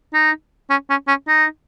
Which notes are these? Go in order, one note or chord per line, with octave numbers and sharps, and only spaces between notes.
D#4
C#4
C#4
C#4
D#4